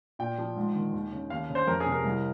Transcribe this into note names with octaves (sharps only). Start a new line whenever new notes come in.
A#2 G5
F3
G#2
D#3
D#2
C#3
D#2 F5
C#3
C5
F2 A#4
G#4
C3
A#4
C2